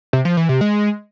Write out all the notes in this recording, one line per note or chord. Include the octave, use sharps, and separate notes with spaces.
C3
F3
E3
C3
G#3